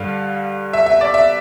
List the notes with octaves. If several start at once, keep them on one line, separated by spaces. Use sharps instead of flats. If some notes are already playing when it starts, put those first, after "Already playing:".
Already playing: G2 D3 G3 F5
E5
E5
D5
E5